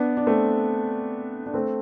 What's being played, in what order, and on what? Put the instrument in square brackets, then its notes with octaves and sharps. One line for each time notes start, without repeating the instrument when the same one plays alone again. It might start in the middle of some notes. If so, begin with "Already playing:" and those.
Already playing: [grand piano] B3 D4
D4
A3 C4
D4
A3 C4